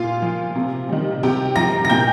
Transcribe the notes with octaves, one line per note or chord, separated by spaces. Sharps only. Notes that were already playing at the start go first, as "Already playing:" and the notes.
Already playing: A#2 F4 F5
F3
C3
D#3 G3
C3 G4 G5
F3 A#5 A#6
A#6
A#2 G5 G6